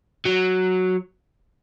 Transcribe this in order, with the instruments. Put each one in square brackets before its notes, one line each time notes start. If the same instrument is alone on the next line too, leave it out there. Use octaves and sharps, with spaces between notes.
[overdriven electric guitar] F#3